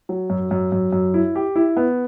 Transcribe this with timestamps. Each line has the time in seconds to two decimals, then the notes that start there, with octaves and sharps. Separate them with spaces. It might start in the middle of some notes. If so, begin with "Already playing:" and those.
0.09 F#3
0.30 F#2
0.51 F#2
0.72 F#2
0.93 F#2
1.14 E4
1.35 G4
1.56 E4
1.77 B3